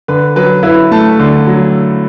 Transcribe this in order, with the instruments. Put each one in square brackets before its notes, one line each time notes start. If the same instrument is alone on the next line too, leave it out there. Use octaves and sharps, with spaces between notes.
[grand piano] D3 B4
F#3 B4
E4 B4
A3 A5
D3
F#3